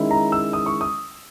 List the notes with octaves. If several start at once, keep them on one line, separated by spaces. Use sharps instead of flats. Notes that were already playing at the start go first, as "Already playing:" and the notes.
Already playing: D#3 G#3 C#4 E4
A#5
E6
D#6
C#6
D#6